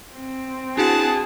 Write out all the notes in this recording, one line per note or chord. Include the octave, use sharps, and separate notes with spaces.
C4
D4 E4 F#4 G#4 B4 F#5 A5